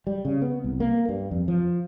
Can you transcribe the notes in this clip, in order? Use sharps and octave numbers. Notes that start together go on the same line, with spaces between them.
G3
C#3
B3
C2
A#3
G2
F2
F3